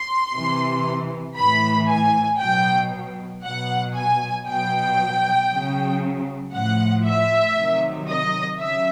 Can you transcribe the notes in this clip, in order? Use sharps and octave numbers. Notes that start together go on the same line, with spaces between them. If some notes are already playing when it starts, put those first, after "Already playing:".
Already playing: C6
C3 E3
A2 E3 B5
G#5
B2 F#3 G5
B2 F#3 F#5
G#5
B2 F#3 G5
C#3 F#3
A2 F3 F#5
E5
C3 D#3 F#3
D#5
C#3 F#3 E5